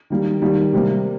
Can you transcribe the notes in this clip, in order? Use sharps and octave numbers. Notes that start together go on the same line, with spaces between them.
D#3 G3 A#3
D#3 G3 A#3
C3 G3 A#3